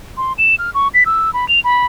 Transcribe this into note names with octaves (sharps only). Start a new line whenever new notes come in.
C6
E7
F6
C#6
B6
E6
B5
F7
B5